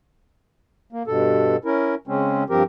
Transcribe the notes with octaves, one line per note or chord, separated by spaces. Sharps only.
A#3
G2 B2 A4
C#4 E4 A#4
C#3 G#3 C4 C#4
G2 F3 C4 G4 A#4